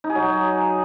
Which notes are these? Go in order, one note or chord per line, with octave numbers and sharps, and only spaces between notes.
D#4
G#4
F#3